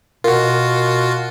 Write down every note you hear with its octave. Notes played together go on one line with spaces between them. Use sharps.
B2 F4 F#4 A#4